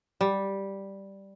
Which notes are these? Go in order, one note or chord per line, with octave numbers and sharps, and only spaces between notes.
G3